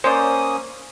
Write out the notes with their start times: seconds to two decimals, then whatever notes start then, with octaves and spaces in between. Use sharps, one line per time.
0.04 A#3 C#4 C5 D5 D#6